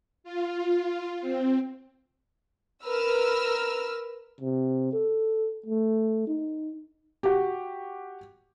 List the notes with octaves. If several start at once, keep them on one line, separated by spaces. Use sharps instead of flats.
F4
C4
A#4 B4 E6 F6
C3
A4
A3
D#4
F#4 G4